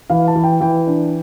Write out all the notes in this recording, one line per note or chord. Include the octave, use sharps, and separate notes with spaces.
E3 F5
A5
E3
G5
E3 G5
D4